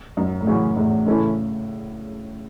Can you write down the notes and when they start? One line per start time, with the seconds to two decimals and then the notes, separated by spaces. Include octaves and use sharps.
0.17 F#2
0.41 A2
0.47 F#2 C#3 E3 C#4 F#4
0.77 E2 A2
1.06 A2 C#3 E3 C#4 E4 A4